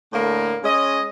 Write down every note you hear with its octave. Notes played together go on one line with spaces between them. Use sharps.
A2 D3 A#3
G#3 C#4 D#5